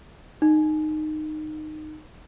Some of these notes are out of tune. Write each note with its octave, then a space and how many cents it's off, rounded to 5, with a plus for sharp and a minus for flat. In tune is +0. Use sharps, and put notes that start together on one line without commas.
D#4 -15